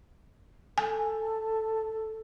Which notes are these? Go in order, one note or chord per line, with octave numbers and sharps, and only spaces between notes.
A4 G#5